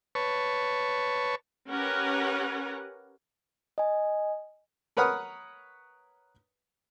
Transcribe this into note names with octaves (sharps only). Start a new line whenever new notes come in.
B4 C#5 A5 C#6
C#4 G4 A#4 B4 F#5
D#5 G#5
A#4 B4 C#5 F#5 D#6 F6